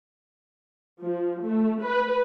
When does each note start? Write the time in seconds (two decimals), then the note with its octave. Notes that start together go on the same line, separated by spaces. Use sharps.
1.02 F3
1.44 A3
1.84 B4